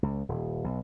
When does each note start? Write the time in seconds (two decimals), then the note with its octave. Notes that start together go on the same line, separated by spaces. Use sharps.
0.03 C#2
0.29 D#1
0.64 B1